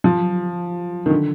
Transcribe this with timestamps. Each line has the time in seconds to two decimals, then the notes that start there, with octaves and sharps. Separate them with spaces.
0.04 F3
1.06 D#3
1.10 D3